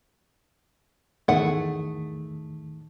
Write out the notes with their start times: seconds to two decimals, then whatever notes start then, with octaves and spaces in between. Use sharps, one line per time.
1.28 E2 A2 D#3 A3 G#4 F#5